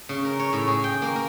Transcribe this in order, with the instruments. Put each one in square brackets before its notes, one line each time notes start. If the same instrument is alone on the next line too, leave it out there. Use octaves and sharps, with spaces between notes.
[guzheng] C#3
A#4
C#5
A2
G#4
G5
A#3
A#4